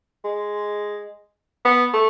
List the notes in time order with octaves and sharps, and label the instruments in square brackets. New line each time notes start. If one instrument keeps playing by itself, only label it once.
[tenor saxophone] G#3
B3
A3